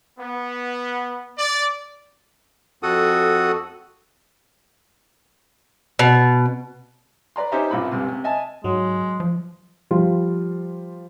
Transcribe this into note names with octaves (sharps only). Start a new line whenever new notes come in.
B3
D5
F2 F#4 A4 F#5 D#6
B2
B4 D5 A#5 C6
C#4 D#4 G4 C5 E5 A#5
C2 G2 A#2 E4 B5
C#2 G2 C3
C3
D#5 E5 G#5 A5
G#2 F#3 G#3
F3
F3 G3 F4